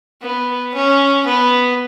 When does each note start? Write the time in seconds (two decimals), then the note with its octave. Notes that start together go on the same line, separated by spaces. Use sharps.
0.22 B3
0.74 C#4
1.26 B3